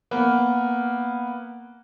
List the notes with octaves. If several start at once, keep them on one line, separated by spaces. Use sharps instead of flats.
A#3 B3